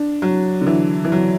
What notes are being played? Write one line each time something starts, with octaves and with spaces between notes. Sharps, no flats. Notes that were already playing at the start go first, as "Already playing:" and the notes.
Already playing: D4
F#3
D3
E3
E3
F#3